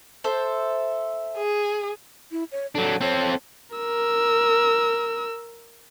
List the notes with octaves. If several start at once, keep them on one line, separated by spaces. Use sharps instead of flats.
A4 C5 E5
G#4
E4
C#5
F#3 D4 A4
C4 A4 C#5
A#4 E6